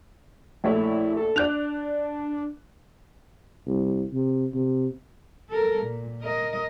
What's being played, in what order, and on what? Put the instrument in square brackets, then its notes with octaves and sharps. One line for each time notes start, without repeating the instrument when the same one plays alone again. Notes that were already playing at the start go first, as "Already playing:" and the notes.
[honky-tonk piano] A#1 A3 C#5 [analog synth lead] E4
[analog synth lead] A4
[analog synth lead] D4 [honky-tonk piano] D5 F#6 F7
[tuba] C2
C3
C3
[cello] A4 A#4
A#2
A#4 D#5